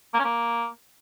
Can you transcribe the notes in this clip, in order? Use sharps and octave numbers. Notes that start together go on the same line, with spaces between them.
A#3
C#4
A#3